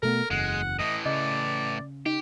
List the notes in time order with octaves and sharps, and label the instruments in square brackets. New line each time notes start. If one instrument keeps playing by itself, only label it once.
[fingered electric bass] B2 A3 B3 [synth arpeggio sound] A4 [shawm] A#4
[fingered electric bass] F#1 E2 [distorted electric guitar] G#3 [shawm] F#5
[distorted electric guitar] A2 E3 [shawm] D#5
[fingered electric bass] C#3 [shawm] D5 [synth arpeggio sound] D#5
[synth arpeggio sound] D#4 [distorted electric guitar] G4